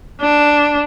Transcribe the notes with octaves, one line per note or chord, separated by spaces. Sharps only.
D4